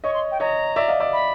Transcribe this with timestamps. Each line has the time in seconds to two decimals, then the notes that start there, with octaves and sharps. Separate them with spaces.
0.04 C#5 D#5 C#6
0.13 C6
0.31 G5
0.40 C#5 D#5 A#5
0.76 D5 E5
0.88 D#5 F5
1.00 D5 E5
1.12 B5